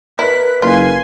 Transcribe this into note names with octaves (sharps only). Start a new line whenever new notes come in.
E4 A#4 B4 F#6 B6
F#1 F4 G#5 C6